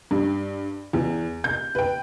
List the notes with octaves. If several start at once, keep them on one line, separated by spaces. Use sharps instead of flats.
G2
E2
G6
B4 G5